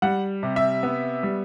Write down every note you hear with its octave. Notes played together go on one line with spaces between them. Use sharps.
G3 F#5
C3
E5
B3
G3